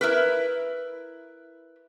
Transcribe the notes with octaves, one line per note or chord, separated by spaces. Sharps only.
E4 A#4 B4